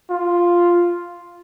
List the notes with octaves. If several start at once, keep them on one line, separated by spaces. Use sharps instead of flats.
F4